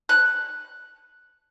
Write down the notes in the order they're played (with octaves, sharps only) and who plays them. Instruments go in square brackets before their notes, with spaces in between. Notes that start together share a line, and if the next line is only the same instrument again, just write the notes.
[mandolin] F#6